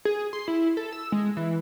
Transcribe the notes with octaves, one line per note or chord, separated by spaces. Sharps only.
G#4
C6
E4
A4
E6
G#3
E3